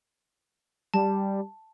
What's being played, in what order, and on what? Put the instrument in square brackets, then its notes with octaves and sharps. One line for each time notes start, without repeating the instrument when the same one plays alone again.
[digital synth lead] G3 [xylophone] A5